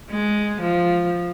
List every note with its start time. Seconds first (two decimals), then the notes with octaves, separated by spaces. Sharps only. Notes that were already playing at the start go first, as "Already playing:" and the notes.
0.10 G#3
0.61 F3